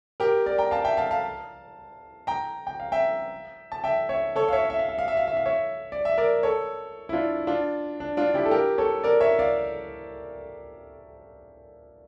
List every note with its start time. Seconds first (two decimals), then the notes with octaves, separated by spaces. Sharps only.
0.20 G4 A#4
0.46 A#4 D5
0.58 G5 A#5
0.71 F5 A5
0.84 E5 G5
0.97 F5 A5
1.11 F5 A5
2.27 G5 A#5
2.67 G5
2.80 F5
2.92 E5 G5
3.72 A5
3.84 E5 G5
4.09 C#5 E5
4.36 A4 C#5
4.49 F5
4.52 C#5 E5
4.70 E5
4.79 F5
4.89 E5
4.98 F5
5.08 E5
5.17 F5
5.27 E5
5.37 F5
5.46 C#5 E5
5.92 D5
6.05 E5
6.18 A#4 D5
6.43 A4 C#5
7.09 E4
7.13 D4 F4
7.47 D4 F4
8.00 D4
8.17 D4 F4
8.34 E4 G4
8.45 A4
8.51 G4 A#4
8.78 A4 C#5
9.04 A#4 D5
9.20 C#5 E5
9.39 D5 F5